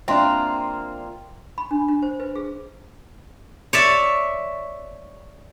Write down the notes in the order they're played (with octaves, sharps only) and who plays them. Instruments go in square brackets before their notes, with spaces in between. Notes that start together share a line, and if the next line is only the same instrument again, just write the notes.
[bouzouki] A#3 C4 F4 [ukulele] D4 G5 [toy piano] E5 C6
[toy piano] B5
D4
D4
C5
B4
G#4
[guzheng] C#5 D5 E5